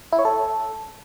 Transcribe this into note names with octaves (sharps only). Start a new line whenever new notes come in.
E4
C#5
A4